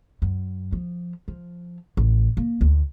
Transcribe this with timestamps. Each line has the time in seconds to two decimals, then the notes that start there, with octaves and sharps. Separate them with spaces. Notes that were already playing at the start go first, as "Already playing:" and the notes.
0.22 F#2
0.73 F3
1.28 F3
1.97 A1
2.37 A#3
2.61 D2